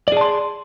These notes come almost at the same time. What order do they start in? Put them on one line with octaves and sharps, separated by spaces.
D5 G#4 A5 C6